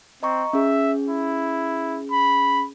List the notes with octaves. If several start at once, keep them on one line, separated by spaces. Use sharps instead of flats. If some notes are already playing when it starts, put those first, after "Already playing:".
C4 D#5 A#5 C#6
C#4 G#4 E5
E4
B5